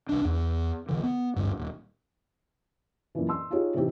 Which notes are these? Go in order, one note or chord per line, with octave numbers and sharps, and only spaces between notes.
C2 D4
E2
B1 D3 E3
B3
G#1 D2 G2
D#1
F#2 A#2 E3
C6 E6
D#4 F4 G4 G#4 C#5
A2 C3 E3 C4 D#4 G4